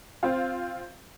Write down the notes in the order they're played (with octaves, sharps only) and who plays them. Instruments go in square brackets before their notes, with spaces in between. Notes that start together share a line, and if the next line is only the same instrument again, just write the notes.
[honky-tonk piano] C4 F4